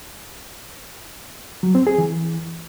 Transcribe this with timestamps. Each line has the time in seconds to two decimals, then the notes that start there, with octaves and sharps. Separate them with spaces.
1.63 F#3
1.75 C4
1.87 G#4
1.98 E3